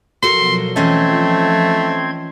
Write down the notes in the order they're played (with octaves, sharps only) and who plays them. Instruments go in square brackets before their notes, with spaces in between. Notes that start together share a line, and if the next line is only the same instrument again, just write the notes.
[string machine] B2 F3 F#3 [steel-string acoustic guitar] F#4 A4 A#4 [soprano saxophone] C6
[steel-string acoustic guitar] E3 C#4 D#5 [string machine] F3 [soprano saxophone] A3 [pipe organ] C4 C6 G#6